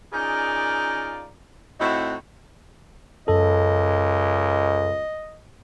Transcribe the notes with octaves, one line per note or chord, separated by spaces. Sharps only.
C#4 D#4 F4 G#4 A#4 D5
A2 C4 D#4 E4 F#4
C#2 F#2 A4 D#5